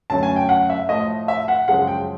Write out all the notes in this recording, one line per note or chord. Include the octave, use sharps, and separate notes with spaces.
F#2 D3 F#3 A3 A5
G#5
G5
F#5
E5
A2 F3 A3 D#5
E5
F#5
F#2 C#3 F3 G#3 F#5
G5